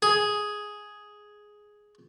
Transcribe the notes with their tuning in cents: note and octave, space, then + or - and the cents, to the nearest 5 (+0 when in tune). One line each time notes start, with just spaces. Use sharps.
G#4 +5